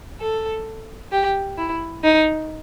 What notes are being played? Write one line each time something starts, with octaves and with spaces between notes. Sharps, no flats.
A4
G4
E4
D#4